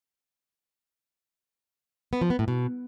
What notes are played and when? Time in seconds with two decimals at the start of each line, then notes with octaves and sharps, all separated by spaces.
2.13 B3
2.21 F3
2.30 B3
2.39 A2
2.48 B2